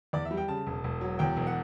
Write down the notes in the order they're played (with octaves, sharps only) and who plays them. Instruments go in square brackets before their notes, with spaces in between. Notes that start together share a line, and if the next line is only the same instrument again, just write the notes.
[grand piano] E2 D5
E5
G3
G5
C#3 A5
E1
E1
F#3
E2 G5
E1
F#5